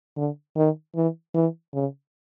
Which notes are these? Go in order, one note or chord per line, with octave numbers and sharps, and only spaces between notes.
D3
D#3
E3
E3
C#3